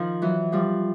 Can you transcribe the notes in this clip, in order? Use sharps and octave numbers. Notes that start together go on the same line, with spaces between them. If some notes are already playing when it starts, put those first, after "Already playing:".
Already playing: D#3 F3
E3 F#3
F3 G3